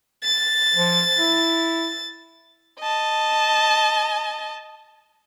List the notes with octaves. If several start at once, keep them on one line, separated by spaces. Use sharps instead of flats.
A6
F3
E4
D#5 A5